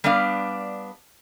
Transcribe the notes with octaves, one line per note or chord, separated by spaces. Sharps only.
G3 B3 D4 D5 F5